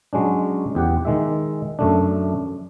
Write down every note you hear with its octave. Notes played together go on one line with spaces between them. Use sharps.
F#3 G#3 C#4 D4
E2 G4 F#5
D#3 G#3 E5
F#2 A3 D4